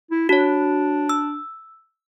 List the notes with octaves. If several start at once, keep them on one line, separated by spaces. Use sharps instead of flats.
E4
D4 F#4 C#5
E6